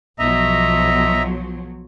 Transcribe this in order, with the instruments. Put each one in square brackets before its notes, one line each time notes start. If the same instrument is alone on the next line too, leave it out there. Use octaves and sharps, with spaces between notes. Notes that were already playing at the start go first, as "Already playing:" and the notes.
[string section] B1 F3 F#3 [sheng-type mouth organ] D#5 E5 A#5